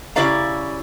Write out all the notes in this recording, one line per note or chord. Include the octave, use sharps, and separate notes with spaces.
C#3 E4 G4 D5 F5 A#5